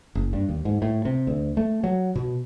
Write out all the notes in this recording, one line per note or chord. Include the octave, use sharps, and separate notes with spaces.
F#1
G2
D#2
G#2
A2
C3
D2
A3
F#3
B2